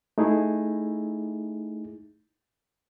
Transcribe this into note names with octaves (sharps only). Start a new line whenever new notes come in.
A3 D#4 E4 G#4